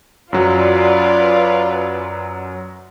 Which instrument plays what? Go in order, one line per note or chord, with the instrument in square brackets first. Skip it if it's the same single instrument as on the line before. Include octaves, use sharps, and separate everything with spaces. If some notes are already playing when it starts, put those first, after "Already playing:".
[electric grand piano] F#2 F#3 [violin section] F4 B4 D5